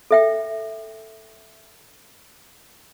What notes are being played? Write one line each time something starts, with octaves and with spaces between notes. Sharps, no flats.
A4 E5 G5